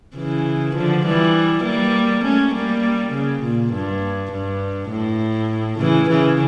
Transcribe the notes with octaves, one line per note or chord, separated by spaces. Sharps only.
C#3 E3
D3 F3
E3 G3
G3 A#3
A3 C#4
G3 A#3
C#3
A#2
G2
G2
A2
C#3 E3
C#3 E3